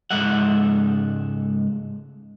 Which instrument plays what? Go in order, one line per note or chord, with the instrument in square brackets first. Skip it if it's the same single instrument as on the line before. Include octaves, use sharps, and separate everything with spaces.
[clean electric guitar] C#2 G#2 G#3 A4 E5 F#5